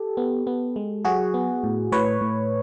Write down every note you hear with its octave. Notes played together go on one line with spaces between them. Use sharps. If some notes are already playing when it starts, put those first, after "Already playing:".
Already playing: G4 A4
B3
B3
G#3
F#3 F#4 G#4
B3
A2
A2 B4 C#5
A2